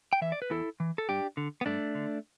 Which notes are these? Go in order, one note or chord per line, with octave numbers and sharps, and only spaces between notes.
G5
E3 E5
D5
B4
E2 E4 A4
E3
A4
G2 D4 G4
D3
B3
G2 A3 D4
D3